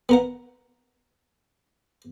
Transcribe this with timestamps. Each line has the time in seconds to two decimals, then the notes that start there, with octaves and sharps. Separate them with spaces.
0.09 B3 A#4 F#5